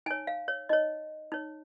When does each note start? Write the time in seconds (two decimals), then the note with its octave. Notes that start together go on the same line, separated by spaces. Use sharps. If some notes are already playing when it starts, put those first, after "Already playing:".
0.06 D#4 C#5 G#5
0.27 F5
0.48 C#5
0.69 D#4 C#5 D#5
1.32 D#4 C#5